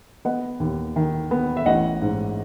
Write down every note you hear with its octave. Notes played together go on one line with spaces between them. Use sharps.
B3 D#5 F#5
D#2
D#3
B3
E5
A1 D#5 F#5
G#2